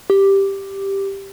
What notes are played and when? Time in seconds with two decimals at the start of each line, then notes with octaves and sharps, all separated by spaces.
0.10 G4